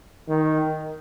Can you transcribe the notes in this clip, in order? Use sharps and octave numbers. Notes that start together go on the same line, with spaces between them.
D#3